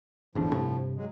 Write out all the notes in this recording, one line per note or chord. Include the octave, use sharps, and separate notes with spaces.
G1 E2 A2 F3 D4
G2 C3
F#3 G#3